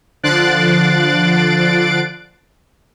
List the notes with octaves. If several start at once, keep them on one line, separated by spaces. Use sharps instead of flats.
D3 F3 F#6 A6 C7 D7